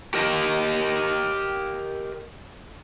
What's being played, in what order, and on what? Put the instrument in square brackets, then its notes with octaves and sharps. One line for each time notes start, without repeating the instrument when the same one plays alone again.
[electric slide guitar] G4 A#4 D#5